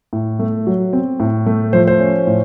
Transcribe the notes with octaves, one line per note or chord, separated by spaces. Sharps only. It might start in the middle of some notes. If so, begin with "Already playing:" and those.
A2
A3
F#3
C4
A2
A3
F3 C5
C5
C#4
A2